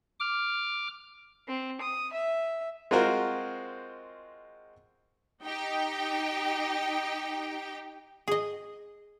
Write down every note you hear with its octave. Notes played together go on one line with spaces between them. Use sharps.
D6 F6
C4
D#6
E5
G#3 C4 F4 F#4 A#4 C5
D#4 G4 G5
G#4 D#5